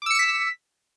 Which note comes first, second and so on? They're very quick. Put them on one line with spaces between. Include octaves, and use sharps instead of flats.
D6 E6 C#7 E7 B6